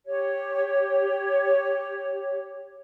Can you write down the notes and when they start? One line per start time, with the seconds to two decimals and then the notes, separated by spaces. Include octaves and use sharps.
0.05 G4 C#5